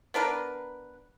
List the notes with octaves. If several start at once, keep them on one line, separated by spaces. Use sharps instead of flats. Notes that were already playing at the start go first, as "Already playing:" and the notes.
B3 D4 A#4 B4